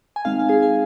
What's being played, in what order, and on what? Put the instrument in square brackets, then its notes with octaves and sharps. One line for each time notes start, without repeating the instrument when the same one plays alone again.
[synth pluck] G#5
D#3 G#3 C4 D#4 F5
F5
G#4 G#5
G#5